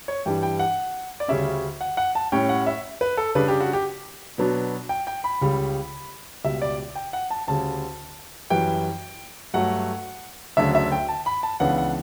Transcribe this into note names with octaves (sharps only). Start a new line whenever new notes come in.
C#5
G2 E3 G3 D4 G5
G5
F#5
D5
D2 C#3 G3 C#4 E5
F#5
F#5
A5
A2 G3 C#4 G5
F#5
E5
B4
A4
C#3 G3 D4 B4
G4
F#4
G4
B2 F#3 B3 D4
G5
G5
B5
C#2 C#3 G3
C#2 B2 G3 E5
D5
G5
F#5
A5
D2 C#3 G3 A5
F#2 E3 G3 G5
G2 F#3 A3 F#5
D2 C#3 F#3 A3 D4 E5
E5
G5
A5
B5
A5
C#2 C#3 E3 B3 D4 F#5
F#5